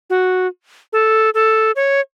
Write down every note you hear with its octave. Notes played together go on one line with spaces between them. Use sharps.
F#4
A4
A4
C#5